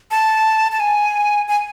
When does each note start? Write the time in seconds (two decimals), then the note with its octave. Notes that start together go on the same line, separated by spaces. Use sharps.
0.11 A5
0.72 A5
0.80 G#5
1.49 G#5